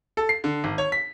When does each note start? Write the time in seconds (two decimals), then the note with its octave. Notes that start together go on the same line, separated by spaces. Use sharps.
0.17 A4
0.29 C7
0.44 D3
0.64 G#1
0.78 C#5
0.92 B6